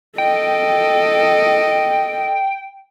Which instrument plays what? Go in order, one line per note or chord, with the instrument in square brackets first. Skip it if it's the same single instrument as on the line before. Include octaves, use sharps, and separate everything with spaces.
[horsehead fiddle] A4 D#5 [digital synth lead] G5